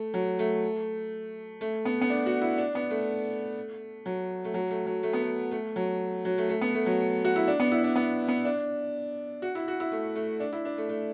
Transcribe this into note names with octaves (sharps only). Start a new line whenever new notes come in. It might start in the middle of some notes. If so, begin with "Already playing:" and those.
Already playing: A3
F#3
A3
A3
B3
B3
D4
F#4
E4
D4
B3
A3
F#3
A3
F#3
A3
F#3
A3
B3
A3
A3
F#3
F#3
A3
A3
B3
A3
F#3
F#4
E4
D4
B3
E4
D4
B3
B3
D4
F#4
E4
F#4
E4
A3
A3
D4
E4
D4
A3
A3